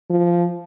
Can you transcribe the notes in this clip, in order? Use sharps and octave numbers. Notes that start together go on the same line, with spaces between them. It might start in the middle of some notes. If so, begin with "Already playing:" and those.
F3